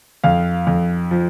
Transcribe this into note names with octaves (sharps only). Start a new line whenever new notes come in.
F2 F5
F2
F3